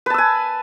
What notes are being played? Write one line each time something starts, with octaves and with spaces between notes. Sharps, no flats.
B4 G#5 A5 E6